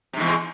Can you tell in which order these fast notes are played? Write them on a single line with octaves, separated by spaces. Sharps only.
C3 G#2 E2